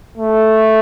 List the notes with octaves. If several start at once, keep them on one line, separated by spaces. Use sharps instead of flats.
A3